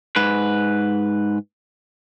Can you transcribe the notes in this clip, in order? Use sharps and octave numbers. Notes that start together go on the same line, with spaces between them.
G#2 B4